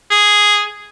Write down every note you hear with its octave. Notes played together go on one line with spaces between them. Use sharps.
G#4